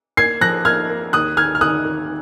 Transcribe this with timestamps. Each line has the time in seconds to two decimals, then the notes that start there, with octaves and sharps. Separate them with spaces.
0.17 A#3 G#6 C7
0.41 F3 F#6 A#6
0.65 A#3 F6 G#6
0.89 A#3
1.13 D#2 D#6 F#6
1.37 D#3 F6 G#6
1.55 F6
1.61 D#3 D#6 F#6
1.85 D#3